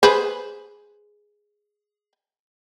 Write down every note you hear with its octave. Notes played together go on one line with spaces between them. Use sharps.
G#4 B4 C5